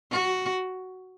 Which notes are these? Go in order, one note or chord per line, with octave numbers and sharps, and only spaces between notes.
F#4